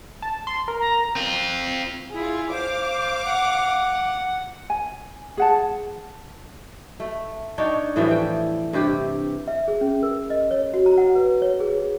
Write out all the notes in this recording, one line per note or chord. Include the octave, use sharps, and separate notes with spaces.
A5
C6
A#4
A#5
C4 F4
E4 F4 G#4
C5 F5 D6
F#5
G#5
G#4 F#5 A5
A3
D4 D#4 C#5 G5
A2 E3 F3 G3
G5
G2 C3 G4
E5
G#4
C#4
A#4
D#5
C#5
F#4
A#5
F#5
B4
C#5
G#4